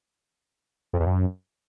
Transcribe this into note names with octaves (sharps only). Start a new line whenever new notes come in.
F2
E2
F#2